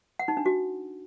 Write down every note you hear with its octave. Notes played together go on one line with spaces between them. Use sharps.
F#5
D#4
D4
F#4